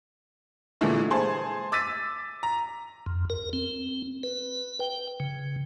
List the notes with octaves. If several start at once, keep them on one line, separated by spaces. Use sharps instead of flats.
A#2 D3 E3 G#3 A3
G#4 C5 A5
D6 E6 A6 B6 D#7
A#5
F2
A#4
C4
B4
G5
C#3